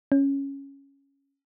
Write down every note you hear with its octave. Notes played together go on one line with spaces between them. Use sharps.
C#4